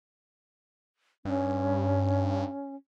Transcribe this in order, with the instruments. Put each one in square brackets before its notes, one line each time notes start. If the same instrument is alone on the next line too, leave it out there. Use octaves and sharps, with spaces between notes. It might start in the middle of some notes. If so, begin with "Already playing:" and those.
[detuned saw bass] G2 [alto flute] C#4